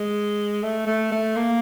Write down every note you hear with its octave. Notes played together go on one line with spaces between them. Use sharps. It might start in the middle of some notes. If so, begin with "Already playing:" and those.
Already playing: G#3
A3
A3
A3
A#3